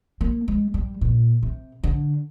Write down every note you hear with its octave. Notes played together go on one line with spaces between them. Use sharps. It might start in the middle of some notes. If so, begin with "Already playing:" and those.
A#3
G#3
G3
A#2
C3
D3